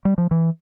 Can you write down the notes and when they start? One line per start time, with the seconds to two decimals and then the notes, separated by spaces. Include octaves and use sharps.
0.05 G3
0.18 F3
0.31 E3